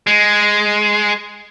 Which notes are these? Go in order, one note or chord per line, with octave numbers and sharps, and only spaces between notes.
G#3